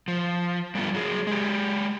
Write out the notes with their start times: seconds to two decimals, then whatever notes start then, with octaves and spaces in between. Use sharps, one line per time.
0.08 F3
0.75 G3 A3 B3 F4
0.94 F#3 G#4
1.27 G#3 G4